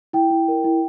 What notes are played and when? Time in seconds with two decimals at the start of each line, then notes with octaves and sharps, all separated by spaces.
0.13 E4 G5
0.31 E4
0.48 A#4
0.64 E4